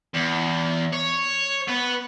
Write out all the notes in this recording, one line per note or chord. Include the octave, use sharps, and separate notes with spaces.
E2
C#5
B3 B4